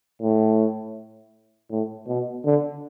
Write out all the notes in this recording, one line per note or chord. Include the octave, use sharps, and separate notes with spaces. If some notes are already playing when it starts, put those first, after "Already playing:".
A2
A2
B2
D3